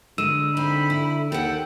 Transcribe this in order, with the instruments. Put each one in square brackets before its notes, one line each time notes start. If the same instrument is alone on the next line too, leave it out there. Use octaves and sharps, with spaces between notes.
[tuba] D3 [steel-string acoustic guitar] G#3 [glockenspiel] E6 D#7 E7
[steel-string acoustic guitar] C4 D#4 [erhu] B5
[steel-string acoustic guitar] E4
[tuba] D#2 [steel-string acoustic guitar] A4 F#5 [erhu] G5